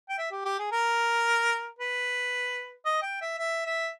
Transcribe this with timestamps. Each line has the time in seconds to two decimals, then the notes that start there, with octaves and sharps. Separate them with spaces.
0.09 G5
0.18 E5
0.31 G4
0.45 G4
0.58 G#4
0.71 A#4
1.79 B4
2.85 D#5
3.02 G5
3.21 E5
3.38 E5
3.65 E5